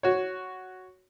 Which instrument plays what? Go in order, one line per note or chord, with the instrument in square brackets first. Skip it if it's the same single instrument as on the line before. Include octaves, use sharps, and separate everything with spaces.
[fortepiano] F#4 C#5